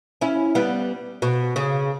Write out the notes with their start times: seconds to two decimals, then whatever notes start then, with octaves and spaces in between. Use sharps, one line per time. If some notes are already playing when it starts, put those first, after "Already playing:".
0.21 C#4 E4
0.55 G3 B3
1.22 B2
1.56 C#3